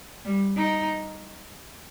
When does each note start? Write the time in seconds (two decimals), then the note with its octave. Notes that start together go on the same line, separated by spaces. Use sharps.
0.25 G3
0.56 D#4